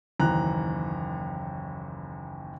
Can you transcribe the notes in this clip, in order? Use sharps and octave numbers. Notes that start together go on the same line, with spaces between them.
F#1 D#2 E3 A#5 F#6